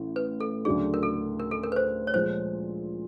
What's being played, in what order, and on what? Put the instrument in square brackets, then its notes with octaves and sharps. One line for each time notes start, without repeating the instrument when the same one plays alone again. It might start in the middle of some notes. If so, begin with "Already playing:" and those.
Already playing: [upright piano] A1 A2 E3
[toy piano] B4
A4
[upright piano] D2 C#3 F#3 A3 D4 [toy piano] G#4
[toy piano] A#4
A4
A#4
A4
A#4
B4
C5
C#5
[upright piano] A#2 F3 G#3 [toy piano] C5